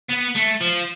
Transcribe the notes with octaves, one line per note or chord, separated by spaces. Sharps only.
B3
A3
F3